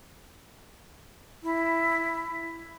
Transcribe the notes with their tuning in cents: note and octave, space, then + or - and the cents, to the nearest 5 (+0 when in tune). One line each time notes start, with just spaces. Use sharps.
E4 +5